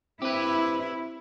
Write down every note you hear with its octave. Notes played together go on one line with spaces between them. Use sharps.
C4 E4 G4 B4